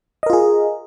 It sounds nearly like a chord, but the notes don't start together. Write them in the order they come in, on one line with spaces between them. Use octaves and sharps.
D#5 A#4 F4 G#4